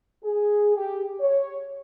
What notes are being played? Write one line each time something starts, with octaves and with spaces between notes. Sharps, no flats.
G#4
G4
C#5